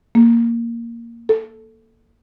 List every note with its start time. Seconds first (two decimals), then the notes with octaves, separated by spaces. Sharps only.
0.15 A#3
1.29 A4